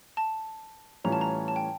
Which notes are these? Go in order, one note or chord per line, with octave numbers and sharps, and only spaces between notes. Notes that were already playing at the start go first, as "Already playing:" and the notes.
A5
A2 E3 G3 C#4 F4 A#5
A5
A#5
A5
G5